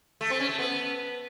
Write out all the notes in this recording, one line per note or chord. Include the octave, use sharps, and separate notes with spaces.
A3
C4
C#4
A3
B3